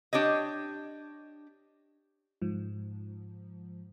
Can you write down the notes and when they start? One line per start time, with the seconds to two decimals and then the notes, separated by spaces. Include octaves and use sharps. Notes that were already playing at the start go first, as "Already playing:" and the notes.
0.13 D4 G4 C#5 D#5
2.42 G#2 F3